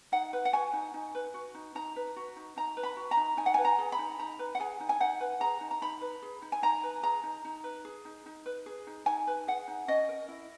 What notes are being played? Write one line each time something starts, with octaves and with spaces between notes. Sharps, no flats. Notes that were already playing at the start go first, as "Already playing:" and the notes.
D#4 F#5
B4
F#5
F#4 G#5
D#4
D#4
B4
F#4
D#4
D#4 A#5
B4
F#4
D#4
D#4 A#5
B4
B5
F#4
A#5
D#4
D#4 G#5
F#5
B4 G#5
A#5
G#4
B5
D#4
D#4 A#5
B4
F#5
G#4 G#5
D#4
G#5
D#4 F#5
B4
G#4 A#5
D#4
A#5
D#4 B5
B4
G#4
D#4
G#5
D#4 A#5
B4
G#4 A#5
D#4
D#4
B4
G#4
D#4
D#4
B4
G#4
D#4
D#4 G#5
B4
G#4 F#5
D#4
C#4 D#5
A#4
E4